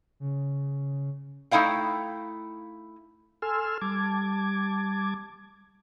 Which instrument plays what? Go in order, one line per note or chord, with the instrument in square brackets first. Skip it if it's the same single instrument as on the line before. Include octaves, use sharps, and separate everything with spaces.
[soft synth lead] C#3
[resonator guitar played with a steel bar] A3 D#4 E4 F5 G5
[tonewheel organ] A4 G#5 C6 E6 F6
G3 A5 D6 G#6